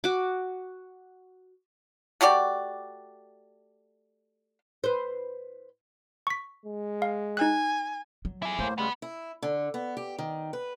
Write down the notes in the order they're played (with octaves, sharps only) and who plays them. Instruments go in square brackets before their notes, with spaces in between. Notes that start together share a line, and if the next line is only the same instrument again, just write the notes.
[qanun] F#4 D6
[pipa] A3 F#4 G4 D5
[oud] B4 C5
[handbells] C#6 B6
[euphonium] G#3
[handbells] F5
[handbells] D#4 F#6 [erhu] G#5
[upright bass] F#3
[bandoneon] F2 D6 [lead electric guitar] E4 G#4
[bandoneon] A2 A#3 C5 [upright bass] A3
[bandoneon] C#3 G3 G#3 [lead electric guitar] B3 B4
[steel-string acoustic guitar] E4
D3
B3
G4
D#3
B4